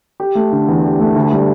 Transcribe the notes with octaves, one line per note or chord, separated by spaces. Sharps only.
G4
A3
D3
E2
G4
A3
D2
G3